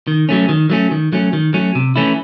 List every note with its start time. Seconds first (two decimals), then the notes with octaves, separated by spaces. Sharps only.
0.08 D#3
0.29 F#3 A3 C#4
0.49 D#3
0.70 F#3 A3 C#4
0.91 D#3
1.12 F#3 A3 C#4
1.33 D#3
1.54 F#3 A3 C#4
1.75 C3
1.96 E3 A3 C#4 E4